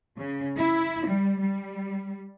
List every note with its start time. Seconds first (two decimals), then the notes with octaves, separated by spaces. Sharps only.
0.17 C#3
0.58 E4
1.06 G3
1.41 G3